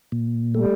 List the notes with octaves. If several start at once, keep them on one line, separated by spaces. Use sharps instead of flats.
A#2
G3 A3